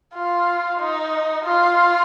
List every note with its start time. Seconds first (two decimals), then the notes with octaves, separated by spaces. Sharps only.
0.14 F4
0.79 D#4
1.44 F4